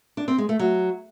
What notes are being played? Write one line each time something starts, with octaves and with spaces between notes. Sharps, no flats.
D4
C4
G#3
A3
F#3